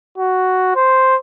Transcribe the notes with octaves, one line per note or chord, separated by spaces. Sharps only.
F#4
C5